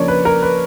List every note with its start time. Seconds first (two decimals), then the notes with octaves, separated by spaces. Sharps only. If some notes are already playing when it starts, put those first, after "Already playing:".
Already playing: C#3 F3 A#3 D4 C#5 D5
0.08 B4
0.25 A#4
0.42 B4